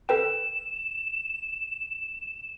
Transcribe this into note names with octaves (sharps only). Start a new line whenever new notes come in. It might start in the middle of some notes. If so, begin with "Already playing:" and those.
A4 B4 G5 E7